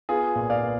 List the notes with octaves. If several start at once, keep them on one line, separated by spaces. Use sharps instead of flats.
B3 F4 G#4
A#2
D5 F5
B3